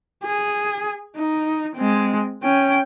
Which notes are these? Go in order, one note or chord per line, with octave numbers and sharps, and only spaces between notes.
G#4
D#4
G#3 C4
C#4 G5